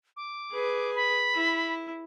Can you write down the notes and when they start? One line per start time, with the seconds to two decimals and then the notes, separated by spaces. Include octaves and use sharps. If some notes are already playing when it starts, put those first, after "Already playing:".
0.17 D6
0.51 G#4 B4
0.95 B5
1.35 E4